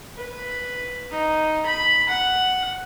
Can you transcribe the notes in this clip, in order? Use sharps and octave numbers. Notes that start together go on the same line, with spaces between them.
B4
D#4
B5
F#5